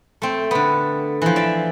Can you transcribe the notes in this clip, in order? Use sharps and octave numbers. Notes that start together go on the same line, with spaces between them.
A3 C4
D3 B3
E3 F3
D5 E5